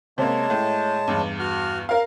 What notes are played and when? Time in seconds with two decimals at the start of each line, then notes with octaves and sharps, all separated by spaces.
0.18 C3 G#3 A#3 C#5 A5
0.50 A2
1.08 E2 G2
1.39 F#4 F6
1.89 A#4 F5